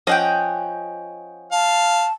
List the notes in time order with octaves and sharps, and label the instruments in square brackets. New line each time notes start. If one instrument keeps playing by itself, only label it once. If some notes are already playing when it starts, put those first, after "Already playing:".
[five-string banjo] F3 C#4 [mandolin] D#5 F#5 G5
[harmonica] F5 [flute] A5